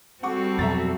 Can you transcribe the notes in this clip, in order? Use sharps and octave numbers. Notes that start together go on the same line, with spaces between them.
G3 C4 F#4 A4 F#5 C#6 D6
F2 B2 F#3 E5 A#5 A6